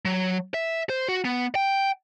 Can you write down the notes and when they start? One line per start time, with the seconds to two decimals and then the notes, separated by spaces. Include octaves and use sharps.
0.05 F#3
0.54 E5
0.89 C5
1.08 F#4
1.25 B3
1.55 G5